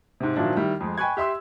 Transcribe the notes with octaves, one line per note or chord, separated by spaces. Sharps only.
G#2 C3
A#2 D#3 F3 F#3 D4 E4
D#3 G3 E4
F2 G#3
G5 G#5 B5 C#6 F#6 G#6
G4 E5 C6 E6